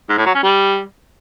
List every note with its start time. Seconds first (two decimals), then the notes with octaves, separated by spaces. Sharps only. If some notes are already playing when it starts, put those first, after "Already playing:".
0.09 G#2
0.18 A2
0.26 F#3
0.34 C#4
0.43 G3